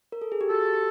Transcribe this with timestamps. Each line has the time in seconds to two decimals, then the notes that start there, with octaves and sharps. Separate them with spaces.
0.12 A#4
0.22 A4
0.32 G#4
0.41 G4
0.50 F#4 A4
0.66 G4